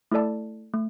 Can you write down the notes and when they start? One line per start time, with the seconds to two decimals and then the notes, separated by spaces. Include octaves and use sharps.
0.11 A3 E4 A4 D5 A5
0.74 A3